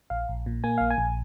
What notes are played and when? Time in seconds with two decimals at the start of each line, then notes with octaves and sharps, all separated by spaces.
0.10 A#1 F5
0.29 A#1
0.46 A#2
0.64 A#3 G#5
0.78 A#1 F5
0.90 G#5
0.98 A#1